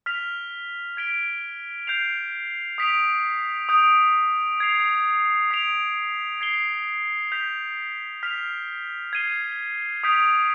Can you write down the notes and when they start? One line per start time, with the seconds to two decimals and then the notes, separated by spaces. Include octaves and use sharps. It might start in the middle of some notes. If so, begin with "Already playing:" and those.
0.06 F6 B6 F7
0.97 G#6 B6 D7 G7
1.87 G6 C7 F7
2.78 D#6 B6 D7 F7
3.69 D#6 G6 D7
4.60 G#6 C7 F7
5.51 D#6 B6 D7 F7
6.41 G#6 C7 G7
7.32 G6 B6 F7
8.23 F6 B6 F7
9.13 G#6 C7 D#7 G7
10.03 D#6 G6 B6 D7 F7